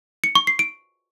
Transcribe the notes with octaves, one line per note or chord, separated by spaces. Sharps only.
C#7
C#6
C7
D7